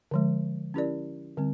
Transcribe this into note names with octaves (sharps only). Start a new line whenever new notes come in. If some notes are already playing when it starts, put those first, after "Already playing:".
D3 F3 G#3
C#4 E4 G4 A#4 D5
D3 G3 C4